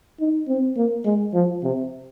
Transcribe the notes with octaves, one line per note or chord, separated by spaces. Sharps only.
D#4
C4
A#3
G#3
F3
C3